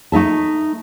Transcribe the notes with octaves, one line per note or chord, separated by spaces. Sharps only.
A3 D#4 E5 A5